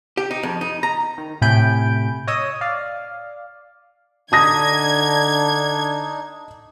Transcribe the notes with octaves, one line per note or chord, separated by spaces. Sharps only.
G4
D#4
F2
D#4
A#5
D#3
A2 C3 G#5 B5 G6 D7
C#5 D#5 D#6 E6
D5 F5
D3 D4 D#4 A5 D#6 G#6 A#6